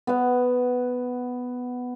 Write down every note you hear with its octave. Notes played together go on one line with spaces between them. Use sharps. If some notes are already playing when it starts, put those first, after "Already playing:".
B3 F#5